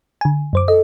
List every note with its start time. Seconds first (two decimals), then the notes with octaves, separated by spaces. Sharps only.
0.21 D3 G#5
0.53 F#2 C5 D6
0.68 A4 D#5